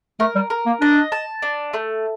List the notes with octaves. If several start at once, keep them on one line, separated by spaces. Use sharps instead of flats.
A3 A#4
G3
A#4
A#3
D4 D#5
A5
D4
A3